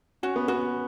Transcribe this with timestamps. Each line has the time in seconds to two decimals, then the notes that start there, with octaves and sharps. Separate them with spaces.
0.23 C#4 F#4
0.36 B3
0.48 B3 F#4